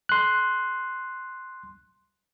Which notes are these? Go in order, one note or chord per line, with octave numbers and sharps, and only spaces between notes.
C6 F#6